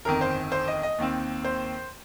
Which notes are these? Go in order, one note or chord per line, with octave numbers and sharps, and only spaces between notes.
G1 F2 D#3 A#4
C5
C5
D#5
D#5
D#2 D#3 C4
C5